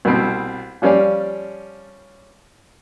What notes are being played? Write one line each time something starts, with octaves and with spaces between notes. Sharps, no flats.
C2 B2 C4
F3 G3 C#4 D5 F5